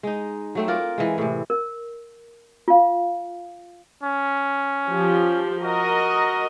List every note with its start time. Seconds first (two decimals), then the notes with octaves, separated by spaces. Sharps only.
0.03 G#3 D#4
0.55 F#3 A3 C4
0.68 F4 A#4 D5
0.98 E3 G#3
1.18 A2 C3
1.50 A#4
2.68 F4 F5
4.04 C#4
4.90 F3 G4
5.62 F#4 A#4 D#5